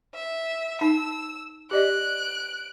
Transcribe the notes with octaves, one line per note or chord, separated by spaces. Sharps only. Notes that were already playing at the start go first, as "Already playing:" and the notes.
E5
D#4 A5 E6
G4 D5 D#5 F#6 D7